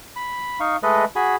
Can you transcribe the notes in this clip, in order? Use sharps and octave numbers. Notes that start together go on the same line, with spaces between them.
B5
D#4 F5 C#6
G#3 A3 A4 B4 D#5
F#4 G#4 G#5 B5